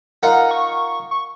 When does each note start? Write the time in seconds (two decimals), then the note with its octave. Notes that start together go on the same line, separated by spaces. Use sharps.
0.23 D#4 F4 A#4 F#5
0.51 C#6
1.11 C#6